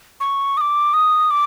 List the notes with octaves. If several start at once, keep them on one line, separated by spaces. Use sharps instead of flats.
C#6
D#6
D6
D#6
D6